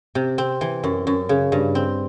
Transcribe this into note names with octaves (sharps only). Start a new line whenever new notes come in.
C3
C4
E3
F#2
F#2
C#3
G2
C4